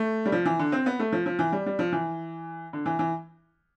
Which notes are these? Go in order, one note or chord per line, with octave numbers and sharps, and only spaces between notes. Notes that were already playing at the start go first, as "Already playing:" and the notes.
Already playing: A3
G3
F3
E3
D3
C4
B3
A3
F3
F3
E3
G3
G3
F3
E3
D3
E3
E3